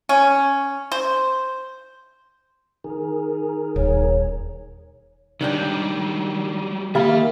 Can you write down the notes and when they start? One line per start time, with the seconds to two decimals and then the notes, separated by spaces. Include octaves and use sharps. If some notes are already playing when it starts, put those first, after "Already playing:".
0.09 C#4
0.92 C5
2.84 D#3 G#4 A#4
3.76 D#1 C#5
5.41 D#3 F#3 G3 D4 G4
6.95 D#3 A#3 G4 A4 E5 F5 B5